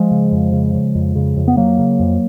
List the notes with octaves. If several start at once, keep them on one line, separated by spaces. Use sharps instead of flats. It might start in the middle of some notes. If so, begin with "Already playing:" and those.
Already playing: F3 G#3
C#3
F2
C#3
C#3
F2
C#3
F2
B3
F2 F#3 A#3
C#3
F2